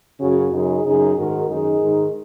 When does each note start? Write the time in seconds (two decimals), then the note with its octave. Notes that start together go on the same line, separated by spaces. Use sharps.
0.20 F#2 C#3 C#4 F#4
0.52 F#2 C#3 D#4 G#4
0.85 F#2 C#3 D#4 G#4
1.17 G#2 D#3 F#4 A#4
1.50 F#2 D#3 D#4 G#4
1.82 G#2 D#3